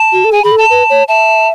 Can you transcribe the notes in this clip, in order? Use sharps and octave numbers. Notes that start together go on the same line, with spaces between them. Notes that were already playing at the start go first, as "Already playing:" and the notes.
Already playing: A5
F#4
A4
G#4 G#5
G#4 B5
A4
A5
B4
C#5
E5 A5